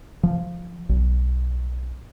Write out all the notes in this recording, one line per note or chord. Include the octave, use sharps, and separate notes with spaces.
F3
B1